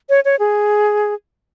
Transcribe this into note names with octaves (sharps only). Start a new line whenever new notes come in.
C#5
C#5
G#4